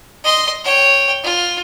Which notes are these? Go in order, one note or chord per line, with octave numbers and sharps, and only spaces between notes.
D#5 C6
C#5 G5
F4